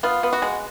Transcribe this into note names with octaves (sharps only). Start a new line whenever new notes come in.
B3 F4
B3
F#4
G#3